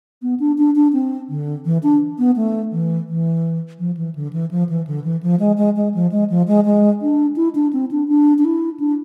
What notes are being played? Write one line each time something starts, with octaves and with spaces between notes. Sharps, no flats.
B3
D4
D4
D4
C4
D3
E3
D4
B3
A3
E3
E3
F3
E3
D3
E3
F3
E3
D3
E3
F3
G#3
G#3
G#3
F3
G#3
F3
G#3
G#3
D4
E4
D4
C4
D4
D4
D4
E4
D4